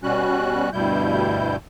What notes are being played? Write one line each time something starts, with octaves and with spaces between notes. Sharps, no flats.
B2 G3 C#4 F#4 F#6
D2 G2 B2 G3 E4 G6